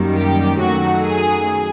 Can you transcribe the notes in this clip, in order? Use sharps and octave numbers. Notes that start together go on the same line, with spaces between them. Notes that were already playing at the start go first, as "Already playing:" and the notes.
Already playing: F#2 D#3 G3 A#3
G4
F#2 D#3 F#3 A3 F#4
G#4